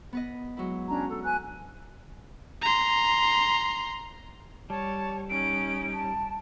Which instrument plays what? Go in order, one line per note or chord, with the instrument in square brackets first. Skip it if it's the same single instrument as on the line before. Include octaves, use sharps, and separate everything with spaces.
[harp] B3 B4 D#5
F#3 G#3 E4
[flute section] C#4 D4 A#5
A4
B4 G#5 F#6
[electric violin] A#5 C6
[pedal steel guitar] G3 [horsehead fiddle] C#5 [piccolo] A5
[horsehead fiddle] C#4 D#4 [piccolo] D7
[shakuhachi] A5